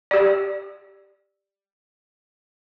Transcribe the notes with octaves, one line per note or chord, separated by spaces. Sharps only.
G4 D5